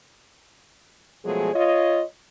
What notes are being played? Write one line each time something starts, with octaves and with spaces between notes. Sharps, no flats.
B2 F3 F#3 G#3 A3 G#4
F4 C#5 D#5